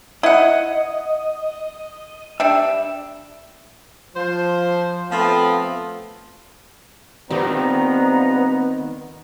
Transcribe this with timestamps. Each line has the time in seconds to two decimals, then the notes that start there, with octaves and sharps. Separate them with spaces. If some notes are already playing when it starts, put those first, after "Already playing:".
0.23 E4 D#5 F#5
2.40 G3 D4 E5
4.16 F3 C5
5.10 F3 A3 B3 C4 F4
7.30 G2 D#3 F3 G#3 B3 C4 G4 A#5